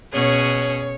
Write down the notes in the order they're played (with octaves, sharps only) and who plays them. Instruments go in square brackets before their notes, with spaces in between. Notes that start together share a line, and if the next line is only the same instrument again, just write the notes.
[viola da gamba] B2 C#4 G#4 [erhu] C#5